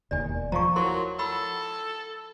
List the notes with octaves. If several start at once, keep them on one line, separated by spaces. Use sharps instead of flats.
E1 D#2 D#3 D5 G#5
F3 A#5 C#6
F#3 E4 A#4 C6
A4 F#5 B5 E6